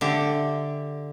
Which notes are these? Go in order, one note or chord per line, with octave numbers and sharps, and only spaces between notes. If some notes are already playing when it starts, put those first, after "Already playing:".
D3 G4 E5